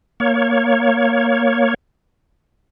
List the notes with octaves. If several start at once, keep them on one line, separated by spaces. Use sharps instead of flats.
A#3 C#5